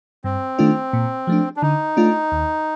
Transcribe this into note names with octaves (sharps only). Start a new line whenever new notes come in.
G2 C4
D#3 A3 D4 F4
A#2
F3 A3 D4
D4
D3 D#4
A3 D4 F4
D#2